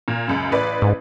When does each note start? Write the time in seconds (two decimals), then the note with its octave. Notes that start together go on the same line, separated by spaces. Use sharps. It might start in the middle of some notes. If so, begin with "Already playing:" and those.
0.08 A#2
0.27 C#2 F#2
0.51 A1 B4 D5
0.82 G#2